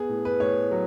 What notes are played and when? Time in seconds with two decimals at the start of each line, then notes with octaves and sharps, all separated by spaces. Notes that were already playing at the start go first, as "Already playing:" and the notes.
Already playing: B3 G#4
0.09 A2
0.25 B4
0.40 A2 C#5
0.71 F#3